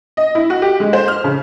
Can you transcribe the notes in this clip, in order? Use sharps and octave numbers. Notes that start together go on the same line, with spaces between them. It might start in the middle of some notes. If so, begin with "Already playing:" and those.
D#5
E4
F#4
G4
G#3
C5
F6
C#3